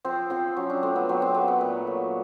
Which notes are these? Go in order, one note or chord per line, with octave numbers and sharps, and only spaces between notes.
F3 C4
F3 C4
F#3 C#4
D4
A3 C4
B3
F#3 C4
C4
A3 B3
B3
A#2
F#3